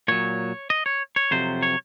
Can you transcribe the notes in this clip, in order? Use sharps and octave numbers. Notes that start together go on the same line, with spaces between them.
A#2 F#3 C#5
D#5
C#5
C#5
F2 C3 F#3 C5
C#5